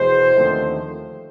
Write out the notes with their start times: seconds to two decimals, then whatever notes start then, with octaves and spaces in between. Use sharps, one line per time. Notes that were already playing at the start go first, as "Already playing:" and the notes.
Already playing: E2 B2 G#3 C5
0.34 D#2 D3 F3 A3 C4